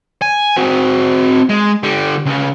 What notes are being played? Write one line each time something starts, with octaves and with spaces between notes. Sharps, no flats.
G#5
C4 F#4
G#3
D3 G3
C#2